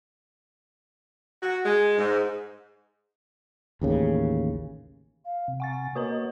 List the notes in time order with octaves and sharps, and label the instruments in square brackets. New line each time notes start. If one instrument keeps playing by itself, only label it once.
[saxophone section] F#4
G#3
G#2
[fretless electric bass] A1 D#2 C#3
[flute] F5
[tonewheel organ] C3
[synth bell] F#5 C#6 A6 [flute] G#5
[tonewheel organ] A#3 C#5 D#5 [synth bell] F#4 B4 A#5 [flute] A4